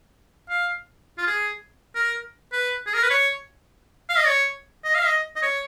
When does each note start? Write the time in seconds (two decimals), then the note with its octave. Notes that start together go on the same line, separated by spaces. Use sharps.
0.49 F5
1.18 F4
1.27 G#4
1.95 A#4
2.53 B4
2.87 G#4
2.94 A#4
3.03 B4
3.10 C#5
4.10 F5
4.17 D#5
4.27 C#5
4.84 D#5
4.95 F5
5.06 D#5
5.36 D#5
5.42 C#5